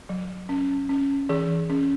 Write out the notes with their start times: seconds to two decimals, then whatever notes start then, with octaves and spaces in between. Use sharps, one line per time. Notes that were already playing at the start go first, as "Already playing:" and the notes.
0.09 F#3
0.49 C#4
0.89 C#4
1.29 E3 G#4
1.70 C#4